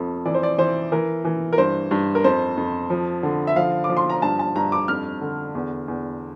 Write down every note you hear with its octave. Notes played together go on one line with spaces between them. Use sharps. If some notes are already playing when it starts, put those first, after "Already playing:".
Already playing: F2 F3
E3 D5
C5
D5
E3 C5
E3 A#4
E3
A#4
G2 C5
G2
A#4
F2 C5
F2
F3
D3
E5
F3 F5
D6
F3
C6
A#5
G2 A5
A5
G2 A#5
D6
F2 F6
D3
E2
E2